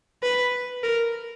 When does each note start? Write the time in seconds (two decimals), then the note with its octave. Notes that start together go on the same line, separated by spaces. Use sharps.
0.23 B4
0.83 A#4